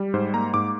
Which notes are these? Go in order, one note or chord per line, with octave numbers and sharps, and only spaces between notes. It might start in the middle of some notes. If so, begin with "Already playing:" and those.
Already playing: G3
G#2 C5
A#3 A#5
G#2 D6